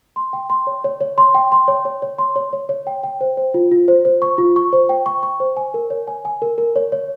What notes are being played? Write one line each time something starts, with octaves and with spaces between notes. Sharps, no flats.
C6
G5
C6
C#5
C#5
C#5
C6
G5
C6
C#5
C#5
C#5
C6
C#5
C#5
C#5
G5
G5
C5
C5
F4
F4
C5
C5
C#6
F4
C#6
C5
G5
C#6
C#6
C5
G#5
A#4
C#5
G#5
G#5
A#4
A#4
C#5
C#5